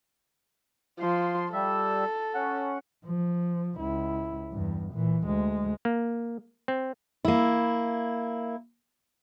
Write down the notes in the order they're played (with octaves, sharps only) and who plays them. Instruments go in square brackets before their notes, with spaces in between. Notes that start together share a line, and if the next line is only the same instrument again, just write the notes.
[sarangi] F3 [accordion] C6
[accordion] G3 E5 [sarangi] A4
[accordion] C#4 F#5
[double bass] F3
C#2 E4
E2 G2
A#2 E3
D2 G#3
[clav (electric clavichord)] A#3
C4
[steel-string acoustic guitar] A#3 E4